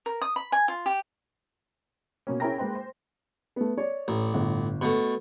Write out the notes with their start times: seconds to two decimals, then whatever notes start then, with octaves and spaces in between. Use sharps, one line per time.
0.06 A#4
0.22 D#6
0.36 B5
0.52 G#5
0.68 F4
0.86 G4
2.27 B2 A#3 C#4
2.40 C#4 E4 G#4 A#4 G5 A#6
2.58 G#3 A#3 B4 C5 G5
2.75 C5
3.56 A3 B3
3.77 C#5 D5
4.08 A1
4.34 G1
4.81 B2 A3